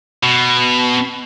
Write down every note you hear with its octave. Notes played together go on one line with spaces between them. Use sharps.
B2